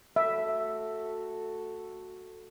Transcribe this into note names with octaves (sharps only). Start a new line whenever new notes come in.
A3 F#4 A4 E5